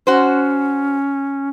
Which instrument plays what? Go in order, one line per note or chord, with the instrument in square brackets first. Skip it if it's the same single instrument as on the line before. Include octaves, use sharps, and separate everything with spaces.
[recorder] C#4 [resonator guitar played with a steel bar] F#4 C5